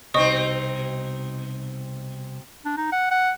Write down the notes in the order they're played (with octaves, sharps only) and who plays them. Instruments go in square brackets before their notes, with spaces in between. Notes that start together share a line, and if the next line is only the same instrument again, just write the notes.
[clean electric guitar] C2 [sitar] B2 C4 D#4 [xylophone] D#5 C#6 D#6
[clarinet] D4
D#4
F#5
F#5